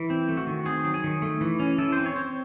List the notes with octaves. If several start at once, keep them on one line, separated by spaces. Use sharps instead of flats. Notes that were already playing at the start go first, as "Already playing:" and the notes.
Already playing: E3
C4
A3
F#4
D#3
C4 G#4
F#3
G#4
D#3
A3
E3
C#4
E3 A4
C4 C5
C#5
C4